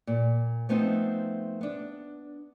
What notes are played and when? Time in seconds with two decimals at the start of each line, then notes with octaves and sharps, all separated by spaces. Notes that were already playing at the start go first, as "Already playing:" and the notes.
0.07 A#2
0.69 F3 A3 B3 C4 D#4
1.61 B3 D4